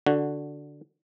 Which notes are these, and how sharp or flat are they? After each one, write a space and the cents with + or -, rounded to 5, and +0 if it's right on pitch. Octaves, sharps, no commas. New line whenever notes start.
D3 +0 F#4 +0